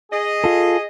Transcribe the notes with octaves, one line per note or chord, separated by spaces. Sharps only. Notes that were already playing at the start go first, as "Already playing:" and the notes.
G#4 D#5
F4 A4